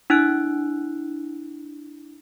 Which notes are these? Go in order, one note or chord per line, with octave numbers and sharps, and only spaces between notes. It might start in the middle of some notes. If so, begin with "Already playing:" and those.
D4 E4 E6 F#6 D7